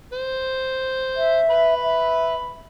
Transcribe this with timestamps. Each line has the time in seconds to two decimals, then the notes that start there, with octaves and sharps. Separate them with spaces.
0.13 C5
1.16 E5
1.50 B4 B5
1.82 E5